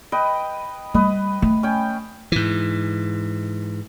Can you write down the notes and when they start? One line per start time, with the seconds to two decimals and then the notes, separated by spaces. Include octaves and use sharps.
0.12 B4 D#5 G5
0.94 G3 B4 D#5
1.42 A3
1.63 C#4 G5
2.32 G#2 E3